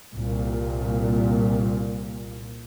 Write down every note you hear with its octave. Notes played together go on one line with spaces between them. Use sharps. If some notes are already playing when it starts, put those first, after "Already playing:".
C2 A#2